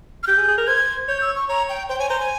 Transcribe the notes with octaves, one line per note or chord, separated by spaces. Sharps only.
F6
G4 G6
G#4
G#4
A#4
C5 G#6
C#5 G6
E6
C#6
C#5 A#5
G5
C5 G5
C#5 G#5
C5 A#5
G#5